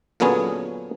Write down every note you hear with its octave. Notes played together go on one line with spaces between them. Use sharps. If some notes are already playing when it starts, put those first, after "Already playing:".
A#2 D3 F#3 B3 C#4 G#4